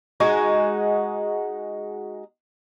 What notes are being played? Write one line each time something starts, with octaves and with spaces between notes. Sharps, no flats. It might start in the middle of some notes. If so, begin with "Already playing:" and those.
G#3 D#4 F#4